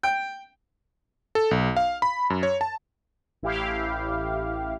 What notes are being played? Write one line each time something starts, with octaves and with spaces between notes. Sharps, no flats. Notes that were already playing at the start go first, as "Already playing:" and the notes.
G5
A4
B1
F5
B5
F#2
C#5
A5
A1 E4 G4 F5